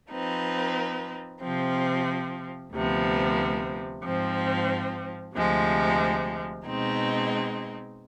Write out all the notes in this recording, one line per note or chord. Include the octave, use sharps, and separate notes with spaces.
F3 C4 D#4 B4
C3 F3 C4
D2 C3 F3 B3
G#2 F3 C4
D2 C3 F3 G#3
B2 G#3 C4 D#4